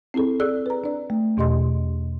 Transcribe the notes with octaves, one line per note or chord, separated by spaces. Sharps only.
C4 E4 G#4 A4
G#4 A4 D5 E6 F#6
B4 A#5
D4 D5
A3
E2 B2 G4 D#5 C6